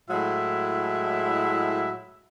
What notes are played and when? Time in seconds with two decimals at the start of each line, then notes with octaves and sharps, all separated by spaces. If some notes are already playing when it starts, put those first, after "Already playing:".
0.11 A2 F#3 G#3 E4 E5